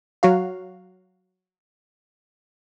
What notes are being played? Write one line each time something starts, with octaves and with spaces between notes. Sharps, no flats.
F#3 F#4 F5